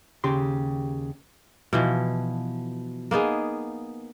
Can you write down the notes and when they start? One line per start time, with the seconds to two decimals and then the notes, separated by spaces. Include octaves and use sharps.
0.24 D#2 C#3 G4 C6
1.73 B2 E3 F3
3.11 A#3 B3 D#4 G#4